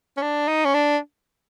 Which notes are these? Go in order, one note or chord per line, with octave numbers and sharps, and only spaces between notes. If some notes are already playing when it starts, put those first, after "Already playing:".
C#4
D4
D#4
C#4
D4